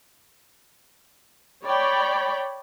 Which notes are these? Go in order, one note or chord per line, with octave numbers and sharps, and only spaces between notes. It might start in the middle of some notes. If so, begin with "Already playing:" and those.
C#5 D5 G5 B5